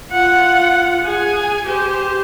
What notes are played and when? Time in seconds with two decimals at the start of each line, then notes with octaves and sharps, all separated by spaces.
0.11 F4 F#5
1.04 G#4 G#5
1.66 G4 C5